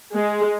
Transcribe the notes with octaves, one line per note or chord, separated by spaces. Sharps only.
G#3